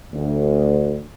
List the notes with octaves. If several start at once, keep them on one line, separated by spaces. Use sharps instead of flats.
D2